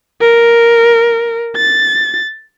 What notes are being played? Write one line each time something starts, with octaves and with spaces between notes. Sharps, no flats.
A#4
A6